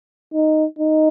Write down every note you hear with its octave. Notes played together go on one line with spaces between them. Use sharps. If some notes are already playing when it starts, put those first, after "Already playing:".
D#4
D#4